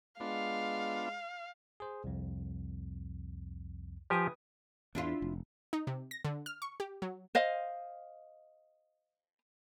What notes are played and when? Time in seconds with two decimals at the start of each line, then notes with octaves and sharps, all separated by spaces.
0.20 G#3 B3 D4 F4 F5
1.80 G#4 C5
2.04 C2 F2
4.10 F3 G4 B4 G#5 D#6
4.95 E2 D4 E4 F4
5.22 F1
5.73 D#4
5.87 C3
6.11 A#6
6.25 D3
6.46 F6
6.62 C#6
6.80 G4
7.02 F#3
7.35 C5 D#5 F5